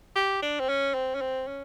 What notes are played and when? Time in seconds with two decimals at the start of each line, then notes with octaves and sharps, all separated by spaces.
0.16 G4
0.42 D4
0.60 C4
0.69 C#4
0.94 C4
1.15 C#4
1.21 C4
1.48 C#4